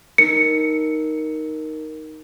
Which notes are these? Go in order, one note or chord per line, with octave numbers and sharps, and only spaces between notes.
D#4 A#4 C#7